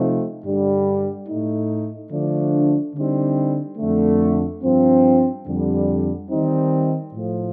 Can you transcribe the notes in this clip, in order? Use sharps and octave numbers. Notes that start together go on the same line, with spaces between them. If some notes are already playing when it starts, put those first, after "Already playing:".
Already playing: C3 F3 A3 C4 D#4
G2 D3 G3
A2 A3 D#4
D3 F3 A3 D4
D3 G3 C4 D#4
F2 D3 A3
G2 F3 C4
F2 D3 G3
D#3 G3 C4 D#4
A2 F3 A3